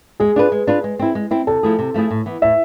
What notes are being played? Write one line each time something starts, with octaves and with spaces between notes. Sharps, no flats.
G#3 G#4
D4 F4 B4
G#3
D4 F4 B4
G#3
C4 E4
G#3
C4 E4
C3 A4
F3 A3 E4 G#4
C3
F3 A3 E4 G#4
A2
E3 B3
A2 E5